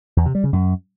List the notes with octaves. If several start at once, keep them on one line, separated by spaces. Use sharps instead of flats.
E2
C3
G3
C#3
F#2